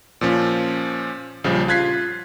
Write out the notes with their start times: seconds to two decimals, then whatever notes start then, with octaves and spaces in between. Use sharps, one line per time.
0.21 A#2 F3 C#4
1.44 A#1 C#3 F3 G3
1.68 F4 F#6 G#6 B6 C7